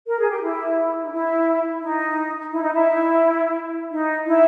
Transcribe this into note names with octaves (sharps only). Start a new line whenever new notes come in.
A#4
G#4
G4
E4
D#4
E4
D#4
E4
D#4
E4
D#4
E4